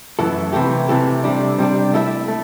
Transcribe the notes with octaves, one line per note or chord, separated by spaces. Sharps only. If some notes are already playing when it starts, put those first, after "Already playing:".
F#2 E3 A3 E4 A4
C3 E3 A3 E4 G4
C3 E3 A3 E4 G4
C3 G3 D4
C3 G3 D4
A3 E4 A4 E5
A3